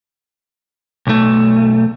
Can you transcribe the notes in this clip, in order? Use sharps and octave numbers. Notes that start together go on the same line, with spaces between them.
B1 A3